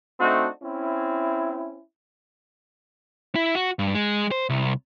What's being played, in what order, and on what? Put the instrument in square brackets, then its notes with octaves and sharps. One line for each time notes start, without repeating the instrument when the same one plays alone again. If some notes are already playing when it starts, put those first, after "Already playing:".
[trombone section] A3 C4 D4 D#4 F#4
C4 C#4 E4
[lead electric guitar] E4
F#4
G2
G#3
C5
C2